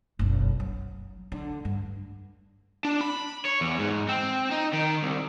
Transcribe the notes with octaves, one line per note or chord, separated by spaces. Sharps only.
F#1 B1
F#3
D3
G2
D4
B5
C#5
E2
G#2
C4
D#4
D#3
C2